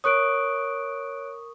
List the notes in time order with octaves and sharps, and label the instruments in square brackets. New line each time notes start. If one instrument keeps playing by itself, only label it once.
[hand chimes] A#4 C#6 D#6 [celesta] C#5 F#6 D7